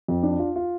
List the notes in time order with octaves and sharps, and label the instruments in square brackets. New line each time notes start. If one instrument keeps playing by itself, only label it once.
[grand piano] F2
D4
F4
F4